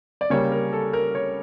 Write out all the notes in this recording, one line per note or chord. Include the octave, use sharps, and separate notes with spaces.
D5
C#3 G3 A#3 C#5
A#4
A4
A#4
C#5